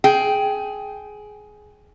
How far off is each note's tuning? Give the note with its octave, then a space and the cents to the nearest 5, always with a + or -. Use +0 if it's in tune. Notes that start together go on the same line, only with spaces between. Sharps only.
G#4 +15 G5 +0